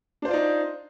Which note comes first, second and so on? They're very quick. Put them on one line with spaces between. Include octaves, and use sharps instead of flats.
D4 C5 F4 D5 D#4